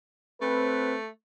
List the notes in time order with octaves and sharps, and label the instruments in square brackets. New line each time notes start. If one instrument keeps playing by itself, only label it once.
[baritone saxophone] A3 [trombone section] C4 B4